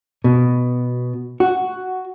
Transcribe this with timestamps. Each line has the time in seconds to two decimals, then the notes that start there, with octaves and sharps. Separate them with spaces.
0.24 B2
1.40 F#4